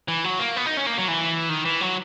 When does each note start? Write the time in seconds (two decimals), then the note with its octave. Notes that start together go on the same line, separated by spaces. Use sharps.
0.08 E3
0.24 F#3
0.39 A#3
0.56 B3
0.66 D#4
0.77 C#4
0.86 A#3
0.98 F#3
1.08 E3
1.49 D#3
1.65 E3
1.81 F#3